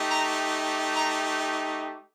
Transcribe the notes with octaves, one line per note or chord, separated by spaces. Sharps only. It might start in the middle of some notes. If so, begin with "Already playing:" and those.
Already playing: A3 D#4 G4
A#5
A#5